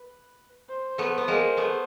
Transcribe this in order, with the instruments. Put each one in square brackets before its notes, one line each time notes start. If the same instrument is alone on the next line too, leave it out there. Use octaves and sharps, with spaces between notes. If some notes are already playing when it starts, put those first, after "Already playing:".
Already playing: [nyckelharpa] B4
C5
[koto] A3 B3
B3
G#3 A#3
A3 B3